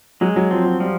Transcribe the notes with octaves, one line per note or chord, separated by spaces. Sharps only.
F#3 G#3
F#3
F3 C4
F#3
F3 G3